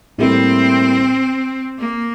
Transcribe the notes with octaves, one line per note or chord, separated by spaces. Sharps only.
A2 G3 A#3 C4 E4 A4
A#3